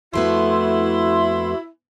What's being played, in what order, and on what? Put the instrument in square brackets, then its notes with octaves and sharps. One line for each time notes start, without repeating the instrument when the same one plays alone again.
[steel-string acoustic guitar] F2 A3 B3 [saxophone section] E4 [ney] F#4 [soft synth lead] C6